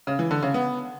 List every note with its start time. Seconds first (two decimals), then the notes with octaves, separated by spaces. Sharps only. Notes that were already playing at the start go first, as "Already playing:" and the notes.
0.07 C#3
0.19 E3
0.31 D3
0.42 C#3
0.54 B3